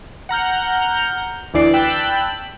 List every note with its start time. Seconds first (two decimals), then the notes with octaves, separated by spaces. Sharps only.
0.29 F#5 A#5 F6 G6
1.54 D2 E3 D5 C7
1.74 G5 A5 B5 E6 F#6